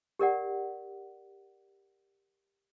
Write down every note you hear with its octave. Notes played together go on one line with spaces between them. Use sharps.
G4 A#4 D5 F#5